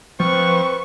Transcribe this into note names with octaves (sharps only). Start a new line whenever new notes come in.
F3 C4 B4 C#6